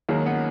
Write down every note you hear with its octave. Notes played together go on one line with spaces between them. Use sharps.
D#2 D#3 F#3 G#3 A#3
B3 C#4